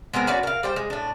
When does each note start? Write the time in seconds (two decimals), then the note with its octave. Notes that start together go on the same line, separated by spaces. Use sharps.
0.13 G#3 B3 C4 A#4
0.27 C#4 F#4 B4 D5
0.43 A#4 F5
0.63 G3 C5 G5
0.76 G#3
0.90 A2 D4